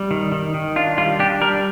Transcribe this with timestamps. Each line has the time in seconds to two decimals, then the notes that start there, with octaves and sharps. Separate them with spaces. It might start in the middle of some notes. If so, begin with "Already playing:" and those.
Already playing: G3
0.11 D#3
0.32 D#3
0.54 D#3
0.76 D4 F4
0.98 G3 F4
1.19 D4 G4
1.42 G3 A#4